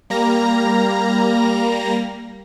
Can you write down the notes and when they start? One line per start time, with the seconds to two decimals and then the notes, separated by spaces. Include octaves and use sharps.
0.10 G3 A#3 A#5 A#6